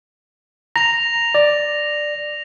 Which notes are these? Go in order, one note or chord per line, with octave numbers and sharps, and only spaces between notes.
A#5 A#6 F7
D5